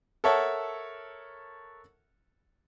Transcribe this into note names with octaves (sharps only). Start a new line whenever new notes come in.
A4 A#4 C#5 E5 F#5 A5